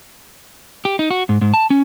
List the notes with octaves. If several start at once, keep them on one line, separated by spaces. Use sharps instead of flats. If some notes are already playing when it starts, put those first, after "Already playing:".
G4
D#4
F#4
G#2
G#2
A5
C#4